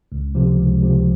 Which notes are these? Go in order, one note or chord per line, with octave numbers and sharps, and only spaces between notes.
C#2
C3 F3
C#2
C3 F3